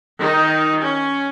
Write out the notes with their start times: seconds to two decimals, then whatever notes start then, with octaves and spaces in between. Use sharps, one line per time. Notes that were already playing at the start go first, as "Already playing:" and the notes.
0.20 D#3 D#4
0.80 C#4